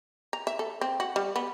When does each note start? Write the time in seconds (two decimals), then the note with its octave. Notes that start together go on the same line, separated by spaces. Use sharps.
0.33 A#5
0.47 E5
0.59 A4
0.81 C4
1.00 F#4
1.16 G3
1.36 B3